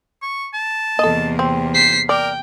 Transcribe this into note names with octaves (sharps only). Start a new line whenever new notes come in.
C#6
A5
E2 C3 A#3 A4 D#5
C4
C5 B6 C7
A#4 D5 G5